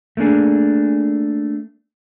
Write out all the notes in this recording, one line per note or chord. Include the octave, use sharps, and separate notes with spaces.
A3 A#3 D4 G#4